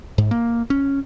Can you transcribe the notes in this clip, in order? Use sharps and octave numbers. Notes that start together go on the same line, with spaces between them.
G#2
A#3
C#4